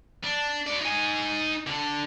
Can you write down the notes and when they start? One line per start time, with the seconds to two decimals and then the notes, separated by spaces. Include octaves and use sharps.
0.24 D4
0.67 F#4 D5
0.81 D#4 G#5
1.67 D3 D4